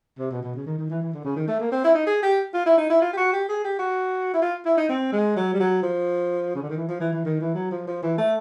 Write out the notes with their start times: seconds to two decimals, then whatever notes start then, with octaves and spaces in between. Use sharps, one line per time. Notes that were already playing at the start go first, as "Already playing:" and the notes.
0.19 C3
0.31 B2
0.42 B2
0.55 C#3
0.66 D#3
0.78 D#3
0.90 E3
1.02 E3
1.13 D3
1.24 C#3
1.36 D#3
1.48 A3
1.60 A#3
1.71 C4
1.84 E4
1.95 D#4
2.07 G#4
2.23 G4
2.54 F4
2.66 E4
2.77 D#4
2.90 E4
3.02 F4
3.13 G4
3.17 F#4
3.33 G4
3.49 G#4
3.64 G4
3.79 F#4
4.34 E4
4.42 F4
4.65 E4
4.77 D#4
4.89 C4
5.12 G#3
5.36 F#3
5.54 G3
5.60 F#3
5.83 F3
6.55 C#3
6.62 D3
6.69 D#3
6.77 E3
6.88 F3
7.00 E3
7.13 E3
7.25 D#3
7.40 E3
7.55 F#3
7.71 F3
7.87 F3
8.03 E3
8.18 A3